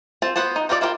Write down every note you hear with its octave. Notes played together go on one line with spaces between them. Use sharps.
C4 F4 A5
B3 F#4 C5 F#5 A5
D#4
D#4 F4 A4 A#4 D5
E4 F4 A#4 B4 G5